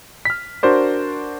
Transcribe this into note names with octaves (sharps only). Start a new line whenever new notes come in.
F6 B6
D4 F#4 A#4 C5 D5